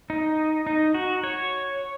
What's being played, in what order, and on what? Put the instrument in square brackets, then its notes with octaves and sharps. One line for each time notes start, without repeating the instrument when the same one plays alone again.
[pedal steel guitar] D#4
D#4
F#4
C#5